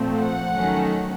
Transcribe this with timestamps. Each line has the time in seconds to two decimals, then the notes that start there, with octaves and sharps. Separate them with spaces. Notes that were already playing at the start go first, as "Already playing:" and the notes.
Already playing: A#2 F3 A3 C4
0.19 F#5
0.55 D#3 F#3 A3 C#4